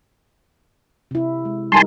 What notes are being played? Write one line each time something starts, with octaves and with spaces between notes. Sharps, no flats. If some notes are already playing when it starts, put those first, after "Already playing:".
C3 E4
G#3
G3 D#4 A#4 G#5 A5 C6